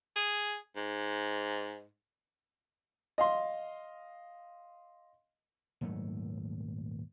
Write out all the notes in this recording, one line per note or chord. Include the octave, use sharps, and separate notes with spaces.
G#4
G#2
D#5 F5 C6
D#1 G#2 F#3 A3